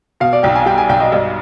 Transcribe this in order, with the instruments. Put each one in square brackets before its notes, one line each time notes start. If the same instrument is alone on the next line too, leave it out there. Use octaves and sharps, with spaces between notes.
[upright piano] B2 [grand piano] F5
[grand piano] D5
[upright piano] B1 [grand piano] G5
[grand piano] G#5
[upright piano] G3 [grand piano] G5
[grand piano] G#5
[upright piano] B1 [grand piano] G5
[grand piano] D#5
[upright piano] G2